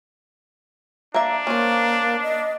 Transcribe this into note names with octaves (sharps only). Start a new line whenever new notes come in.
A#3 D4 E5
A#3 C#4 C5
D#5